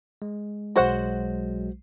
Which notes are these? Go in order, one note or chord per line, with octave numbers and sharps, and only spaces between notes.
G#3
B1 F#3 G#3 F#4 C5 F#5